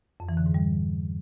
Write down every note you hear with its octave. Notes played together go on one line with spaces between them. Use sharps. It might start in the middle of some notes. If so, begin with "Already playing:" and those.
F2
E3
D3
G#2
G3